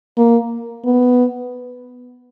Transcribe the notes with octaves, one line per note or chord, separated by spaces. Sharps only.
A#3
B3